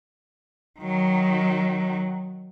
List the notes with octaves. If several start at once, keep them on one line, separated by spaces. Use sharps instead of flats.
D#3 F#3